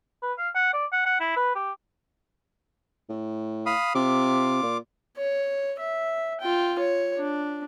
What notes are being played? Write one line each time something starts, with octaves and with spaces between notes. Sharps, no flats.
B4
F5
F#5
D5
F#5
F#5
E4
B4
G4
A2
F5 B5 D#6
C3 F4 D6
A#2
C#5
E5
F4 G5
C#5
D4